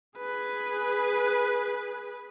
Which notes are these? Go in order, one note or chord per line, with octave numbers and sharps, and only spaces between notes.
G#4 B4